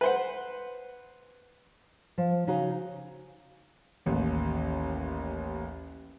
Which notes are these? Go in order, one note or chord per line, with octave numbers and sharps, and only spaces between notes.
B4 C5 F#5
F3
C#3 D#4 F#4 F5
A1 D#2